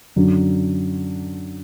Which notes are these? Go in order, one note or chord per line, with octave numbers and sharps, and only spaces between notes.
F#2 D3 F#3